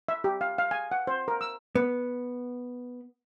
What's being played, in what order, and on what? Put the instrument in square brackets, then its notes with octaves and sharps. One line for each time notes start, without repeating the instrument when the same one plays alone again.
[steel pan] E5
G4
F5
F5
G#5
F#5
C5
A#4
E6
[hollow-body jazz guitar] B3